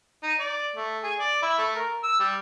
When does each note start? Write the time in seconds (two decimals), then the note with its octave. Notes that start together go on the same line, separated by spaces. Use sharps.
0.23 D#4
0.39 D5
0.76 A3
1.03 G#4
1.20 D5
1.42 E4
1.58 A3
1.76 A#4
2.03 E6
2.20 G3